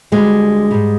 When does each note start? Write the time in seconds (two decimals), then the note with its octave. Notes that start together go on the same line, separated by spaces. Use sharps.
0.12 D2 D3 G3 G#3
0.71 G#2 G3